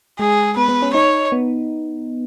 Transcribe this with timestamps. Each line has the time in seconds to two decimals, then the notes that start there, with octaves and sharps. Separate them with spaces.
0.19 G#3 G#4
0.57 B3 B4
0.69 B3
0.82 C#4
0.94 D#4 C#5
1.32 B3